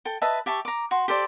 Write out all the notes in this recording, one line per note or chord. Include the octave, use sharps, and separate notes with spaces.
A4 G5
B4 D#5 E5 A5
G4 E5 A5 C#6
A#5 D6
F#4 C6
G4 A4 C5 D5